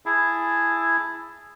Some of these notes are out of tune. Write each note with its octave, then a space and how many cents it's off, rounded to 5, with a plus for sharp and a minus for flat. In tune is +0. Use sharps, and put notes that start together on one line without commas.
E4 +10 G#4 +0 A5 +0